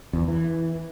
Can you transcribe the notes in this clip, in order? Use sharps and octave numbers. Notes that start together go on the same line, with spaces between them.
E2
E3